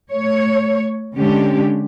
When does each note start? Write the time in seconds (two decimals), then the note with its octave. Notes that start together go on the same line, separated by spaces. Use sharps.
0.11 A3 C#5
1.16 D3 G#3 C#4 D4 G4